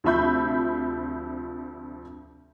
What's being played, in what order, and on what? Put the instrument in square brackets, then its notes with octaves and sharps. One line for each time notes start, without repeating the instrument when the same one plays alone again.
[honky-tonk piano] D2 C3 F3 E5 B5 G6